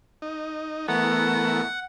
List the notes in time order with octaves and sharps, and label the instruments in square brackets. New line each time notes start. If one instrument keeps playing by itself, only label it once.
[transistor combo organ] D#4
[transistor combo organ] E3 A3 A#4 [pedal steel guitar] B3 [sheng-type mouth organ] F#5